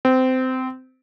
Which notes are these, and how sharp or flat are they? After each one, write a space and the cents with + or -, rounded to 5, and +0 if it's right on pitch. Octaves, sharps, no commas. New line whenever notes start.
C4 -20